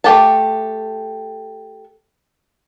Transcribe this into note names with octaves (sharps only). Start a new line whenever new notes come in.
A3 G4 A4 A5